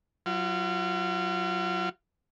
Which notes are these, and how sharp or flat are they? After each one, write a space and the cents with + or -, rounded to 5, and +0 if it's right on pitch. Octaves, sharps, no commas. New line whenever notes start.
F#3 +0 F4 -35